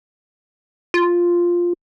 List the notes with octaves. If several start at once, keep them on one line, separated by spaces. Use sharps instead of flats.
F4